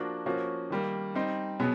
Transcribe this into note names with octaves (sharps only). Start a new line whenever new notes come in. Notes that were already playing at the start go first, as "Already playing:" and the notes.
Already playing: F3 A#3 D4 F#4 A#4
F3 A#3 C#4 F#4
D#3 G3 A#3
G3 C4 D#4
B2 F#3 B3 G#4